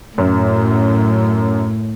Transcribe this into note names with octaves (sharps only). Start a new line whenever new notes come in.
F#2 A2